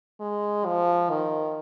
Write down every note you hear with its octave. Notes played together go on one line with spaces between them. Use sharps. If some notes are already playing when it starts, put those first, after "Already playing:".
G#3
F3
D#3